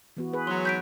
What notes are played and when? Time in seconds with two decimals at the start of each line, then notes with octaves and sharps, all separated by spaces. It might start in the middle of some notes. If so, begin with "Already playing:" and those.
0.17 E3 B3 F#4
0.33 G#4 B4
0.47 G#2 F#3 C6
0.65 G6 B6 D7